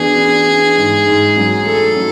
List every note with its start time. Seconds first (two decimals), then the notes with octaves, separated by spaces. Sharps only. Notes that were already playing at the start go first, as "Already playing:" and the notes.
Already playing: E3 B3 D4 F#4 G#4
0.17 D4
0.47 D4
0.77 G#2
1.07 G#2
1.37 F#3
1.66 A3 A4
1.96 F#3